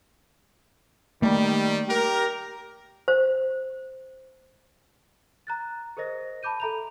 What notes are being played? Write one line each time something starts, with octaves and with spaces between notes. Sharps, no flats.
D#3 G3 A3 A#3
G4 A#4
C5
A#5 F#6 A6
G#4 A#4 C5 D#5 A#6
A5 B5 D6 G6 D#7
A4 E5 A#5 B5 F7